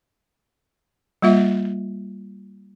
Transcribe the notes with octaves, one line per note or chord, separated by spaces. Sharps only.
G3 A#3 F4 E5